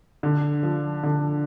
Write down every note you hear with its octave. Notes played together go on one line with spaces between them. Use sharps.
D3
F3
D3